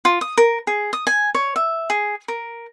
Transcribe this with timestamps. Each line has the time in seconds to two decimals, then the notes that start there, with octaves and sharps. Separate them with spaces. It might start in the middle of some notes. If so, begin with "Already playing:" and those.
0.05 F4
0.21 D#6
0.38 A#4
0.67 G#4
0.93 D#6
1.07 G#5
1.35 C#5
1.56 E5
1.90 G#4
2.28 A#4